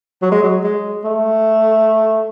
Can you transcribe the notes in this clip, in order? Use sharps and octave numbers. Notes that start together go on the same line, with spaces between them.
F#3
G#3
F#3
G#3
A3